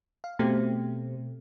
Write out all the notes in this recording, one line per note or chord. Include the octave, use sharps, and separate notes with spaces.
F5
B2 A3 C4 G4